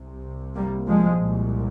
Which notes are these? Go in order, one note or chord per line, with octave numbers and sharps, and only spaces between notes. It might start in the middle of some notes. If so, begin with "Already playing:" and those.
Already playing: C2 C3
G3 A#3
F3 G#3
C2 A#2